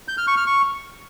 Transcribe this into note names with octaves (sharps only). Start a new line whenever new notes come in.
G6
F6
C#6
F6
C#6